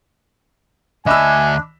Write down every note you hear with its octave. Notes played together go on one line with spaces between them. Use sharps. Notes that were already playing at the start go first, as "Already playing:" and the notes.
D2 D4 D#5 E5 G#5 B5 E6